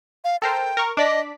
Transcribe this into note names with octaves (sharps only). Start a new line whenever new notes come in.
F5
A4 A#4 C5 G5
A#4 C#6
D4 D5 D#5 B6